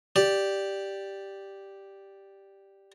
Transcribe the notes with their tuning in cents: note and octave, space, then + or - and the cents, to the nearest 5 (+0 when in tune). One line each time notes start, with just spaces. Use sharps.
G4 +0 D5 +0